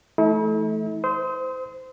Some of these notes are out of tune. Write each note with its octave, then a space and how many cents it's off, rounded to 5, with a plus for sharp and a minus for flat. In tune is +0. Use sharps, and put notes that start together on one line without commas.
E3 +20 A3 -20 E4 -45
C5 -20 D#6 +40